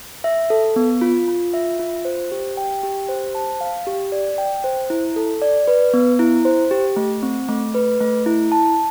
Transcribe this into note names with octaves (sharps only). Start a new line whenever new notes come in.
E5
A4
B3
F4
F4
E5
F4
C5
G4
G5
G4
C5
A5
F5
G4
D5
G5
C5
E4
A4
D5
B4
B3
E4
C5
G4
A3
C4
A3
B4
A3
E4
A5